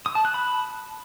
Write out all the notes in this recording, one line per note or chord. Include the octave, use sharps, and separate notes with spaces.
D#6
A5
F#6
B5